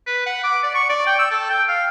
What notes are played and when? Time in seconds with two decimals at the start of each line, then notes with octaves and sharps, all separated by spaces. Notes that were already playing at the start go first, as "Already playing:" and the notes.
0.07 B4
0.26 F#5
0.44 D6
0.63 D5
0.75 C#6
0.90 D5
1.07 G5
1.19 E6
1.31 A4
1.50 G5
1.68 F5